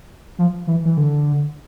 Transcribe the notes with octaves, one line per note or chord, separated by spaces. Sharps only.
F3
E3
E3
D3